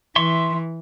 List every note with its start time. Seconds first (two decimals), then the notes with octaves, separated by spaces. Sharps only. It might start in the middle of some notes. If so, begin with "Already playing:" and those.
0.16 E3 E5 C6 C#6